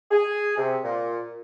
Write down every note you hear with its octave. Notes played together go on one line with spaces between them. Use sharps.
G#4
C3
A#2